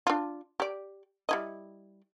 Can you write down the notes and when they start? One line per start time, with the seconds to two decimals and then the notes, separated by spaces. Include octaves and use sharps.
0.07 D4 F4
0.60 G4 D5
1.29 G3 E4 D#5